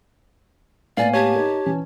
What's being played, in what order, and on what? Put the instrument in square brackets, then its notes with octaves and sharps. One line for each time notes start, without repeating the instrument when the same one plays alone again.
[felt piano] A2 A#3 B3 [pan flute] D5 [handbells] F5 G#5
[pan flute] G4 [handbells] C#5 A5 G#6
[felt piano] D#4 A#4
E3 C#4